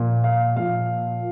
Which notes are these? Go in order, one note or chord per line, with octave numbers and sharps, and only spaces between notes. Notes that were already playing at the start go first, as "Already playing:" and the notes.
Already playing: A#2 F3
F5
A#2 F3 F5